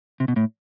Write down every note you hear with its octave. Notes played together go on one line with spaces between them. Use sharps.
C3
B2
A2